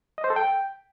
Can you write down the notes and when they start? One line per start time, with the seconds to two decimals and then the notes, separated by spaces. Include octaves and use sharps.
0.18 D#5
0.24 C5
0.30 A4
0.36 G5